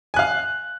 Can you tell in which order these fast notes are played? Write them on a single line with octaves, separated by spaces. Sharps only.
G#5 F#6 F5